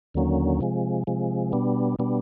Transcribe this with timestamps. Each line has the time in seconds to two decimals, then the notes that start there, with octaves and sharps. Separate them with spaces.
0.14 D#2 D3 F#3 A#3 C#4
0.61 C3 F3 G#3
1.07 C3 F3 G#3
1.52 B2 G3 B3 D4
1.99 B2 G3 B3 D4